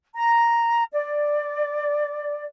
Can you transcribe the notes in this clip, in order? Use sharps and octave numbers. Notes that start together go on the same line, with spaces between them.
A#5
D5